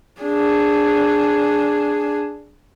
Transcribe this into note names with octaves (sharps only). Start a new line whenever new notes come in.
D4 G#4